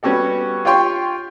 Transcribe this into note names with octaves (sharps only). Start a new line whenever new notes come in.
G3 B3 C#4 F#4 G4 A4
F4 G4 C#5 G5 C6 C#6